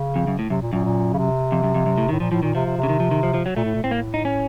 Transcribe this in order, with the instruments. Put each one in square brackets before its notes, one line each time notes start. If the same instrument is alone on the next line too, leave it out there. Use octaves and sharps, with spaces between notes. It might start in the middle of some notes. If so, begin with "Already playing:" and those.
Already playing: [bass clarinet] C#3
[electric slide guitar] F2
F#2
A2
[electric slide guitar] F#2 [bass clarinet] C3
[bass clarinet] A#2
[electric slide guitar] F#2 [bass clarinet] A#2
[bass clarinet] A#2
C#3
C3
[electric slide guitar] F2
F#2
F2
F#2
A2
[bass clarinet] A2 [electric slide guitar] D#3
[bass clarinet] A#2 [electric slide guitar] F3
[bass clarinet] A2 [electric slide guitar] F3
[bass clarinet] A#2 [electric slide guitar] D#3
[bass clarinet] C3 [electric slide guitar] F3
[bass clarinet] C3
C3
[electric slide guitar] C#3
D#3
F3
D#3
F3
F3
F#3
[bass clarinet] A#2 [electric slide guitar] A3
[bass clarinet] A2
A#2
[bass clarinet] A2 [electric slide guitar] C4
[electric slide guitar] A#3
D#4
C#4